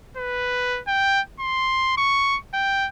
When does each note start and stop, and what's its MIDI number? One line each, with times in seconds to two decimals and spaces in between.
0.17 0.81 71
0.88 1.21 79
1.40 1.97 84
1.98 2.37 85
2.54 2.88 79